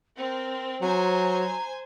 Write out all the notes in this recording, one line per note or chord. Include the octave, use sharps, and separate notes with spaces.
C4 A#4
F#3 C5 G#5 A#5